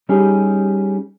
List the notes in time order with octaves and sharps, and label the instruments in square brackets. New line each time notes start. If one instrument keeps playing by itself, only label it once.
[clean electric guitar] G3 C#4 D#4 G4 G#4